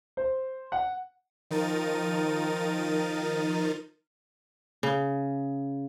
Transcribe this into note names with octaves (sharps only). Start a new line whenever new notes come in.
C5
F#5
D#3 F3 D#4 A#4 A6 D#7
C#3